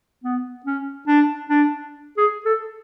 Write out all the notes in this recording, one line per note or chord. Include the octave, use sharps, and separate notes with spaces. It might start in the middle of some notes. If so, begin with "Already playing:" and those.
B3
C#4
D4
D4
G#4
A4